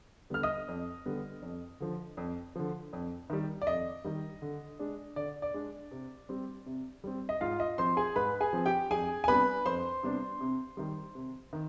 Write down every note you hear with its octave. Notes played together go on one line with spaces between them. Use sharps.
D3 G3 B3 F6
D#5 D#6
F2
D3 G3 B3
F2
D3 F3
F2
D3 F3
F2
D#3 G3
D5
F2 D#5
D#3 G3
D3
G#3 D4
D3 D5
D5
G#3 D4
C3
G3 C4
C3
G3 C4
D#5
G#2 F4 F5
D#5
F3 C4 C5 C6
G#4 G#5
G#2 B4 B5
G#4 G#5
F3 C4
G4 G5
F2 G#4 G#5
G#5
C3 G3 B3 D4 B4 B5
F2 C5 C6
C3 G3 B3 D4
C3
D#3 G3
C3
D#3